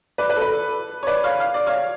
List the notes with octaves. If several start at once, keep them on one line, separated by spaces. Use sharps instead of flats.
B4 D5
B4
A4
B4
C#5
B4 D5
C#5 F5
F5
D5
C#5 F5